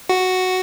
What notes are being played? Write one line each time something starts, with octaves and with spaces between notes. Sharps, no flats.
F#4